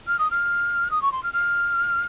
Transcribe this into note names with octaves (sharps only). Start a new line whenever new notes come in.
F6
D#6
F6
D#6
C#6
C6
F6
F6